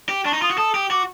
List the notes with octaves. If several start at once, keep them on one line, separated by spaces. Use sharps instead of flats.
G4
D4 C#6
D#4
F4 D#6
F#4
A4 D#6
G4
F#4 D6